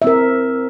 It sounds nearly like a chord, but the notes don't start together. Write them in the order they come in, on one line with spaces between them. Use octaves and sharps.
E5 C4 A#4